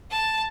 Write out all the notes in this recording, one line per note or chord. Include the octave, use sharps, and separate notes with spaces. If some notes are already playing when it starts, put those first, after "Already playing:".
A5